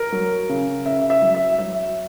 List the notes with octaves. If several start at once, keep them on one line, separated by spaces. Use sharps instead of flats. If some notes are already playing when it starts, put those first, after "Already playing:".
Already playing: A#4
F#3
C#3
C#3 E5
E5
F#3
E5
F#3 E5